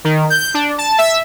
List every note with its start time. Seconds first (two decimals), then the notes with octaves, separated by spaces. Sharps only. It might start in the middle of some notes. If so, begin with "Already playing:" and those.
0.04 D#3
0.30 G6
0.54 D4
0.78 A5
0.98 E5